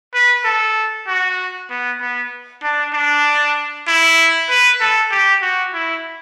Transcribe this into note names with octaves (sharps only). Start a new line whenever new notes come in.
B4
A4
F#4
B3
B3
D4
D4
E4
B4
A4
G4
F#4
E4